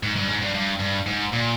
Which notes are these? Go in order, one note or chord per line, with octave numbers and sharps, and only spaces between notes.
G#2
G2
G#2
G2
G2
G2
G#2
A#2